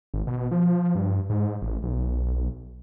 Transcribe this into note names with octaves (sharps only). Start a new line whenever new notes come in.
G#1
B2
F3
G2
G#2
A1
B1